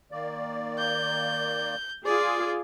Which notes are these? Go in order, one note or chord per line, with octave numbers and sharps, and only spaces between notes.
D#3 A#3 D5
G6
F4 G#4 D5